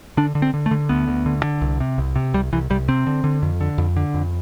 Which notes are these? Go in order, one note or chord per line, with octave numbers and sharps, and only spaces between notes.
D3 D4
D3
C4
D3
A3
D3
D2 B3
D2
D3
D3
C2
C3
C2
C3
C2 G3
C2 E3
C2 G3
C3 C4
D3
D3
F2
D3
F2
D3
F2